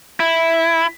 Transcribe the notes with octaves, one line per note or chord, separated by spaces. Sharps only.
E4